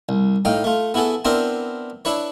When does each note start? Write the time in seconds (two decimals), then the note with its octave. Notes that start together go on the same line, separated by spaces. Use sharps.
0.09 C2
0.45 A2 D#4 F5 G5
0.64 A3 F4
0.94 B3 E4 F#4 G#4 A4
1.25 B3 C4 D4 E4 A#4 C5
2.05 D4 E4 B4 C#5